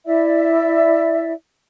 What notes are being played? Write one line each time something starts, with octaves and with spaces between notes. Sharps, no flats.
E4 D5 E5